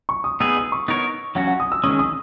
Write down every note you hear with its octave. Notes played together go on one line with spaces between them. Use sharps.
C#6
D#6
B3 D#4 G#4 B4 E6
D#6
C#6
B3 D#4 A#4 C#5
F#3 C#4 F#4 F#5
F#5
D#6
E6
D#3 G#3 C#4 D#6
D#6